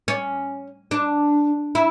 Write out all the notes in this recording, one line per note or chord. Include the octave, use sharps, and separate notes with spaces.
C#4
D4
E4